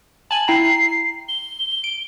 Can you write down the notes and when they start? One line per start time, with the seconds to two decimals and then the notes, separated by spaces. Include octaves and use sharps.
0.31 G#5 A5 F#7
0.48 E4 G5 A#5 C7
1.29 G7
1.84 D7